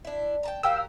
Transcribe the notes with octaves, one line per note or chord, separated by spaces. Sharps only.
D4 E4
G5 A5 A#5
F#3 G4 A#4 F5 G5 E6